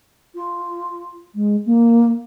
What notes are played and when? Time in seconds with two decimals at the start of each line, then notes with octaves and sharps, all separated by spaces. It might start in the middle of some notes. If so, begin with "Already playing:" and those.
0.34 F4
1.34 G#3
1.65 A#3